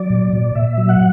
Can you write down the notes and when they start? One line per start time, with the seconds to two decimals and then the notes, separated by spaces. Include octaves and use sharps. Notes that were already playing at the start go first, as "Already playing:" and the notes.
Already playing: F#3 D5
0.10 A#2
0.33 A#2
0.55 A#2 E5
0.78 F#3
0.89 F#5